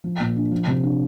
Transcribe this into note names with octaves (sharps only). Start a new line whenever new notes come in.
F3
A#2
D4
F3
C3
D4